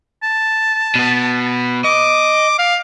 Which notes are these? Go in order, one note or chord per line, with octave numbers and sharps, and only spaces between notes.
A5
B2 B3
D#5 D6
F5